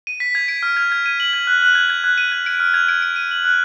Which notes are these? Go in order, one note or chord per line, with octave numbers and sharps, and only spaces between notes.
D#7
B6
G#6
D7
F6
G#6
G#6
D#7
F#7
G#6
F#6
F#6
G#6
G#6
F#6
D#7
G#6
D7
F6
G#6
D7
D7
D#7
F#7
F#6